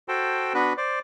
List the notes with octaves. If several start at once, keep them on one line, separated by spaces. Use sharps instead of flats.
F#4 A4 C5 G5 A5
B3 D4 F#4 B4
C5 D5